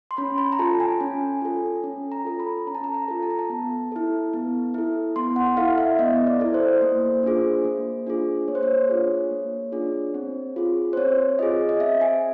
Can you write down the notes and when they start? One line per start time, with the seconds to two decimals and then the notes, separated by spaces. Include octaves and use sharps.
0.11 C6
0.17 C#4 B5
0.38 B5
0.52 A#5
0.59 F4 A4 A5
0.80 G#5
1.00 C#4
1.42 F4 A4
1.84 C#4
2.12 A#5
2.25 F4 A4
2.40 B5
2.67 C#4 A#5
2.75 A5
2.84 A#5
2.94 A#5
3.08 F4 A4
3.23 A5
3.30 A#5
3.39 A5
3.50 B3
3.92 E4 A4
4.33 B3
4.74 E4 A4
5.16 B3 C6
5.36 F#5
5.57 E4 A4 F5
5.78 E5
5.99 B3 D#5
6.27 D5
6.40 E4 A4
6.54 C5
6.82 A#3
7.23 D4 F4 G#4
7.65 A#3
8.07 D4 F4 G#4
8.48 A#3 C#5
8.55 C5
8.63 C#5
8.89 D4 F4 G#4
9.31 A#3
9.72 D4 F4 G#4
10.14 C4
10.56 F4 G#4
10.93 C5
10.97 C4 C#5
11.39 F4 G#4 D#5
11.69 D#5
11.80 C4 E5
12.01 G#5